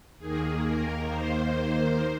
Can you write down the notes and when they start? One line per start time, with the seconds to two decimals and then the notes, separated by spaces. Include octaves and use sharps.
0.18 D#2 D#3 A#3 G#4
0.64 A#4
1.09 C5